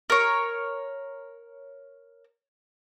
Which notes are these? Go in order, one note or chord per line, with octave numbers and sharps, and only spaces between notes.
A#4 C#5